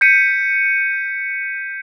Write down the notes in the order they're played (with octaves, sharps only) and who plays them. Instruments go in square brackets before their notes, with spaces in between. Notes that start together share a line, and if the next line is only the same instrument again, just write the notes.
[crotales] G6 B6 C#7 D#7